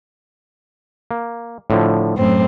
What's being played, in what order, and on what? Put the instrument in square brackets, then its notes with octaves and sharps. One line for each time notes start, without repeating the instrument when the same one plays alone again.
[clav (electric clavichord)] A#3
A2 D3 F3
[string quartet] F#2 A2 C4